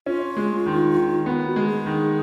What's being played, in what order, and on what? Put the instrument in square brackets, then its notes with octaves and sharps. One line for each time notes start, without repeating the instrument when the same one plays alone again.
[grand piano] C#4 [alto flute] F4
[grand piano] G#3
D#3
D#3
B3
[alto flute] F#4
[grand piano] G#3
[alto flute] G#4
[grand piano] D#3